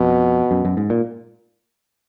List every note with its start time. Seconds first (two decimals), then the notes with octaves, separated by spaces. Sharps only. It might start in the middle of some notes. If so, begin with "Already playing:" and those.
Already playing: F2 B2
0.51 F#2
0.65 F#2
0.77 G#2
0.90 A#2